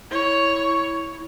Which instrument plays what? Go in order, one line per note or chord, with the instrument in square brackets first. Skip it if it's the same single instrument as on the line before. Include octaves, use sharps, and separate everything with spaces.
[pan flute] E4 [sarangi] C#5